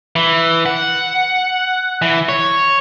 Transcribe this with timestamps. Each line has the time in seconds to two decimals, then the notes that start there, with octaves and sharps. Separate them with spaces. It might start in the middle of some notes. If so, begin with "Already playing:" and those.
0.16 E3
0.66 F#5
2.02 E3
2.29 C#5